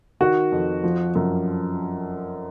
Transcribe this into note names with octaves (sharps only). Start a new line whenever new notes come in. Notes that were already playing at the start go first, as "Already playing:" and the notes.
D#3 F#4
F2
F3
F#2